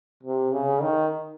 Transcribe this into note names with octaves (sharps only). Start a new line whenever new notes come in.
C3
C#3
D#3